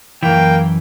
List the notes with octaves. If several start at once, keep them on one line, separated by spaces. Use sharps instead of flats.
F#2 E3 A#3 G5